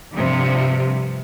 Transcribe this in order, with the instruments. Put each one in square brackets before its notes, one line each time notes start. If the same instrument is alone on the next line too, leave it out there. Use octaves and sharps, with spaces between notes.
[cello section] G2 C3 F3